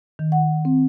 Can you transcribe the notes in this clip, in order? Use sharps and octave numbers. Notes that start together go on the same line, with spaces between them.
D#3
F#5
C4